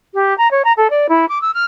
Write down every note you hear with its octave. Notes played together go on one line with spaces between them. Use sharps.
G4
A#5
C#5
A#5
A4
D5
E4
D6
E6
F6